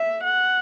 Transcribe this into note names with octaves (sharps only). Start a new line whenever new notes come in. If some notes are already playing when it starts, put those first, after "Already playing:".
Already playing: E5
F#5